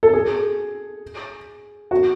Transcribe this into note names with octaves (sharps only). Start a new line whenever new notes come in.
A4
G#4
F#4